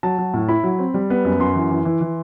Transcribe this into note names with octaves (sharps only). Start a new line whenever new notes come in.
F#3 A5
F#3
A2
E4 B5
F#3
C4
G3
B3
F#2
F#2 C6
E3
E3
E3
E3